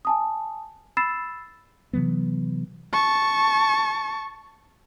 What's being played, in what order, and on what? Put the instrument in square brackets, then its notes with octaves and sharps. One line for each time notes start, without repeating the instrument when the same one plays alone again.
[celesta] G#5 A5 D#6
B5 E6 A6 C7 E7
[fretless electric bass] C3 E3 F#3 B3
[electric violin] A5 C#6